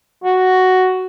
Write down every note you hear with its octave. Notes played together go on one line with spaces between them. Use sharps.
F#4